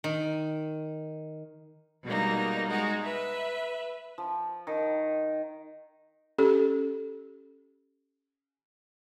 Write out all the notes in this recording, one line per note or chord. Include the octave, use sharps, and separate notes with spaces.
D#3
B2 G3 G#3 A#3 D#4
G#3 D#4 F#4
B4 E5
F3
D#3
C#4 G4 A4